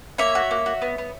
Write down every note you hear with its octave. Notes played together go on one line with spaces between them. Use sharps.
A#3 C#5 E5
F#4
A#3
F#4
B3
B3